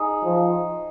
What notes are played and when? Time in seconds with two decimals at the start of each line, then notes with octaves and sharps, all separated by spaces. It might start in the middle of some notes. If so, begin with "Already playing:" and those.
Already playing: D#4 G#4
0.24 F3